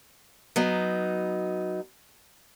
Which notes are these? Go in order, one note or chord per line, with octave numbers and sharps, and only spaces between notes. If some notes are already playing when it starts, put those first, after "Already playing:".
F#3 B3 D#4